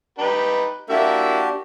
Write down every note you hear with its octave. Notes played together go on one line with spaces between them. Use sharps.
D#4 G4 B4
A#3 D4 E4 F#4 G4 E5